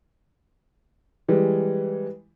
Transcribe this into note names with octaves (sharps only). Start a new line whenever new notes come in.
E3 G3 G#3